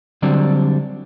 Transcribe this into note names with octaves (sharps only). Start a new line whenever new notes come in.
D3 F#3 G3 C4 D4